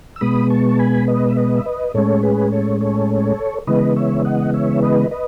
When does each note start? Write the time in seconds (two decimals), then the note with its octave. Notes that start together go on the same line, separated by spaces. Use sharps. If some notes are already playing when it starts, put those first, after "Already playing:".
0.16 E6
0.21 B2 G#3 B3 B5 D#6
0.50 A5 C#6
0.69 A5
0.79 G#5 B5
1.07 B4 D#5
1.29 E5
1.37 B4 D#5
1.57 E5
1.66 B4 D#5
1.94 A2 G#3 C#4 A4 C#5
2.23 G#4 B4
2.52 A4 C#5
2.81 A4 C#5
3.67 C#3 E3 G#3 B3 B4 D#5
3.96 C#5 E5
4.25 D#5 F#5
4.54 C#5 E5
4.82 B4 D#5
5.11 B4 D#5